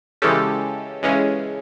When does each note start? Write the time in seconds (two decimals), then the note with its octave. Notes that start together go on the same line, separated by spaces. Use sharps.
0.22 C#3 E3 G#3 C#4 G4 A4
1.03 C#3 E3 G#3 C#4